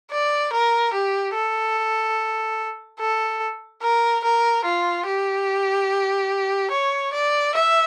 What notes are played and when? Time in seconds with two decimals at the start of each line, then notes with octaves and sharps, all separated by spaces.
0.11 D5
0.53 A#4
0.93 G4
1.35 A4
3.00 A4
3.82 A#4
4.24 A#4
4.64 F4
5.06 G4
6.71 C#5
7.13 D5
7.55 E5